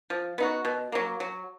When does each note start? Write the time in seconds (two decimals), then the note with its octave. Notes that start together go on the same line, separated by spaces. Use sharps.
0.10 F3
0.38 B3 D#4 F#4
0.65 B2
0.92 F#3 A#3
1.20 F#3